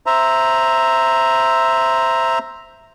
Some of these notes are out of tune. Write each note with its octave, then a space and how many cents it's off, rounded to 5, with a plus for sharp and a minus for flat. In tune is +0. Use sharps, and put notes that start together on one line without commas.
C5 +0 E5 +0 A#5 +0